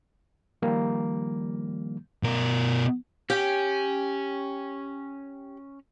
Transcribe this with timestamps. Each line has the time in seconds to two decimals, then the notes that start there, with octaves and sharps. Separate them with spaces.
0.62 D#3 F3 G3 A#3
2.23 B2 A#4
3.30 C#4 G4 G5